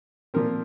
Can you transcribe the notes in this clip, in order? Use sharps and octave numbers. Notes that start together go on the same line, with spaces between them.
A#2 F3 C4 A#4